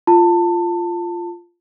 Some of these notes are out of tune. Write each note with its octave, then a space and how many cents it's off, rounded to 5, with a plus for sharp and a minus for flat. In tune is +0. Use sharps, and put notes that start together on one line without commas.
F4 -10 A5 +25